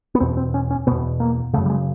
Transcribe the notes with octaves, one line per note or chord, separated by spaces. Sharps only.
B3
E2 B2 C4
C4
C#4
C#4
E2 B2 B3
A#3
F#2 C#3 A3
G3
G#3